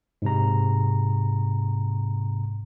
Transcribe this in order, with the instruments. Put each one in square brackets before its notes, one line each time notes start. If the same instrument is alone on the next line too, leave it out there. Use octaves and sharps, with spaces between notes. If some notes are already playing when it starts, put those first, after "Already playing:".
[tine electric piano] G#2 C3 A#5